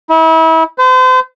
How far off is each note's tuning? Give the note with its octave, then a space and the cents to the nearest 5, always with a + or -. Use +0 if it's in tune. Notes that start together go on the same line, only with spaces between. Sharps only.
E4 -35
C5 -40